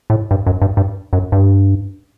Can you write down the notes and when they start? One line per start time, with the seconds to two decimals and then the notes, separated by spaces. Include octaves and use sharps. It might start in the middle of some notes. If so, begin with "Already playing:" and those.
0.10 A2
0.31 G2
0.47 F#2
0.62 G2
0.77 G2
1.13 F#2
1.32 G2